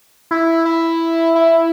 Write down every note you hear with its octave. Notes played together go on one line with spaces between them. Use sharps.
E4
E4
E4